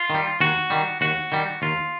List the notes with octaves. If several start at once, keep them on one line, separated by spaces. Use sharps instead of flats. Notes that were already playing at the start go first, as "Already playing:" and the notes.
Already playing: F4
D#3 G3
D#2 F#4
D#3 G3
D#2 F#4
D#3 G3
D#2 F4